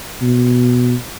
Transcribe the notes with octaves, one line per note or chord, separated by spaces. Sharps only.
B2